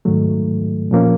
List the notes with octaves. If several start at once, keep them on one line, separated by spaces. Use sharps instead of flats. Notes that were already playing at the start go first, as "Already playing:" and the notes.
G#2 D#3 F#3 A3
A#2 F3 A#3 C#4